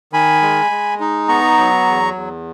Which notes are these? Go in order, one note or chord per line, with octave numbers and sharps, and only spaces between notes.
D#3 G#5 B5
G#3
G#3
D#4
B3 A#5 C#6
F#3
E2
E2